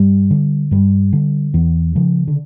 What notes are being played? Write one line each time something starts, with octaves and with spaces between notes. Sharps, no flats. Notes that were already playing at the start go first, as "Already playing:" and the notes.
Already playing: G2 G3
D3
G2 G3
D3
E2 E3
C#3 F3
D3